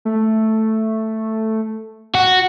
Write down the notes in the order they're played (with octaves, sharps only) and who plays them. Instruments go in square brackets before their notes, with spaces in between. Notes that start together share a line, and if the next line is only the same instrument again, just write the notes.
[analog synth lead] A3
[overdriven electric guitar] F#4